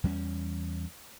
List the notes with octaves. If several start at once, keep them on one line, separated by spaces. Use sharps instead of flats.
E2 G3 C4 C#4